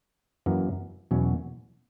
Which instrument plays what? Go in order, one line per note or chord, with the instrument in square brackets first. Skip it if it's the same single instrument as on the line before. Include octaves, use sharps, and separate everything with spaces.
[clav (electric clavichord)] F#2 E3 A#3
E2 B2 F#3 C#4